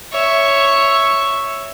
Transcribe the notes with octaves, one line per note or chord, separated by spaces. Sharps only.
C#5 E5